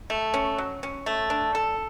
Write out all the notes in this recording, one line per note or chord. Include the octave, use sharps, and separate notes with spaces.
A3
C#4
F#3
C#4
A3
D4
A4